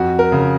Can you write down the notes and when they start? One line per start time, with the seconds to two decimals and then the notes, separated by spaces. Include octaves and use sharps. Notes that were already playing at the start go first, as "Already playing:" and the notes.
Already playing: F2 F#4
0.19 A#4
0.32 C#3